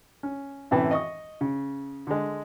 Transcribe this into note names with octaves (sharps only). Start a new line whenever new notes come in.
C#4
F#2 A2 C3 E3
D#5 C#6 D#6
C#3
D3 G#3